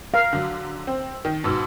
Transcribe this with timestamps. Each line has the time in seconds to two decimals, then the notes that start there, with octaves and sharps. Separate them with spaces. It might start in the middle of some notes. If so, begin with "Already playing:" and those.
0.14 A#4 F5
0.33 D3 F#3
0.87 C4
1.25 D#3
1.44 G#2 B2 E6